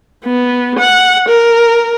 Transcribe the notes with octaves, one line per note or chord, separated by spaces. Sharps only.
B3
F#5
A#4